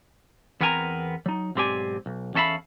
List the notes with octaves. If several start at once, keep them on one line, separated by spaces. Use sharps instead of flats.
E2 B3 C4 A#4 G#5 A#5
F#3 D#4
B1 G#2 C4 G4 D5 G#5
B1
E2 C#4 A4 E5 F5 B5